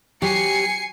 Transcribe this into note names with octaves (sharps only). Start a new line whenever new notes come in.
F#3 G4 G#5 C7 C#7